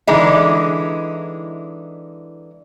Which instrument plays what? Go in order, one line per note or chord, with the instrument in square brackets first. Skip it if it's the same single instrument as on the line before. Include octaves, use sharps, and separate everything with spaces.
[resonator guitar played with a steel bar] D3 E3 G#3 D#4 E4